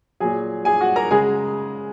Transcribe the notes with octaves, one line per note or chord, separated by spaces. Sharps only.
A#2 F#3 G#4 G#5
G#4 G#5
F#4 F#5
A#4 A#5
C#3 G#3 G#4 G#5